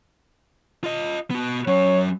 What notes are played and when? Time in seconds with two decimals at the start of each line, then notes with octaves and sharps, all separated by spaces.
0.84 F4 D#5
1.31 B3 F#4
1.68 F#3 C#4 C#5